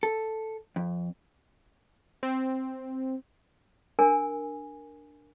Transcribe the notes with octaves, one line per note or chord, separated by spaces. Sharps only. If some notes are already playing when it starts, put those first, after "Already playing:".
A4
F2
C4
D4 A#4 G#5